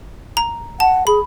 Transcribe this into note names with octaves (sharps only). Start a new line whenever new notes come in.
A#5
F#5 A5
G#4 B5